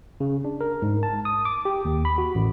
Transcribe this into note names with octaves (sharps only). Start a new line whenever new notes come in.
C#3
D4
A#4
G#2
A5
D#6
D6
G4
D#2
B5
F#4
A1